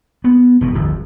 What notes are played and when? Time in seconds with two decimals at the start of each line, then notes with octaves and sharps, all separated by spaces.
0.24 B3
0.61 E1 B2
0.74 D1 G1 F2 F3